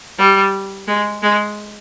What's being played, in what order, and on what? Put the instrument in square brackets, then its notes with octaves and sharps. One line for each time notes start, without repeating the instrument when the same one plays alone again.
[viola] G3
G#3
G#3